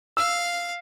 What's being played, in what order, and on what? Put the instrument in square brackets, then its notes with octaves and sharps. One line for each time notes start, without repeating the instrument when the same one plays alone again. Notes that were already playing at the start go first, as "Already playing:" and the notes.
[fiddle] F5 F6 [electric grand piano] E6